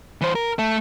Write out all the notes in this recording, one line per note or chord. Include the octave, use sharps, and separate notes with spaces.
E3 C5
A#4
A3